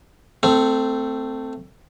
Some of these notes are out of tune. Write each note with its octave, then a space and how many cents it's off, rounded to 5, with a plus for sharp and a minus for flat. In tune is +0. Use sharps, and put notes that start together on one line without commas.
A3 +15 C4 -10